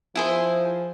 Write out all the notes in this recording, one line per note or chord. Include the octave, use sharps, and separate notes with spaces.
F3 E4 G#4 C5